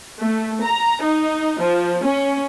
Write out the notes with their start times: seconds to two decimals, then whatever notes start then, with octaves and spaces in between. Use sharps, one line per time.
0.21 A3
0.63 A#5
1.03 D#4
1.62 F3
2.04 C#4